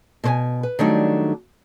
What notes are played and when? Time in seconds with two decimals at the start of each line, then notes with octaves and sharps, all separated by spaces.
0.24 B2 C5 G#5
0.63 B4
0.79 D#3 F#3 G3 A3 D4 D#4